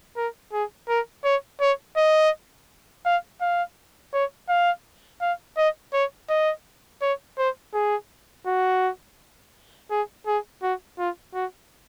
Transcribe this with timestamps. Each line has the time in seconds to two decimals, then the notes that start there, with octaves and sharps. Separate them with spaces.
0.17 A#4
0.53 G#4
0.89 A#4
1.25 C#5
1.61 C#5
1.97 D#5
3.06 F5
3.41 F5
4.13 C#5
4.49 F5
5.21 F5
5.58 D#5
5.94 C#5
6.30 D#5
7.02 C#5
7.38 C5
7.74 G#4
8.47 F#4
9.91 G#4
10.27 G#4
10.63 F#4
10.99 F4
11.34 F#4